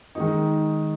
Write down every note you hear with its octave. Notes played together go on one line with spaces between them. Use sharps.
D#3 G#3 D#4